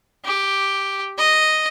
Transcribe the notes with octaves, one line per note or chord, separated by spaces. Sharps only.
G4
D#5